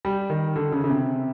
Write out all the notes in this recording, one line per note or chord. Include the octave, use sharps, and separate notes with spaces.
G3
D#3
D3
C#3
C#3
C3